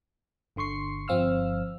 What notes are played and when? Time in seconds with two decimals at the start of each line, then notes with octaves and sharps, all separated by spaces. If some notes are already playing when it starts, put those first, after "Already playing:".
0.56 G1 D3 C6 C#6 C7
1.08 G1 F3 C4 F5 E6 F6